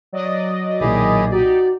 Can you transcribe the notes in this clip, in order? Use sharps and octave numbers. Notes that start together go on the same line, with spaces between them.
F#3 D5 D#5
B1 A#2 D#3 E4 G4 G#4
D#4 F#4 G4 D5